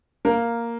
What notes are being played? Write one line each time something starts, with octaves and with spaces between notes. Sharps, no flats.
A#3 A#4